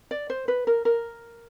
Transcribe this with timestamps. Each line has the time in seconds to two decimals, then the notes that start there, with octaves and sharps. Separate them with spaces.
0.11 D5
0.30 C5
0.48 B4
0.67 A#4
0.85 A#4